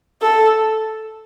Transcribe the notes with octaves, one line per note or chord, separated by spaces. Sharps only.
A4